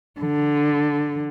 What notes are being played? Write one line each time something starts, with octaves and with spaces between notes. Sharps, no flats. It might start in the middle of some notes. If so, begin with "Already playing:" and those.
D3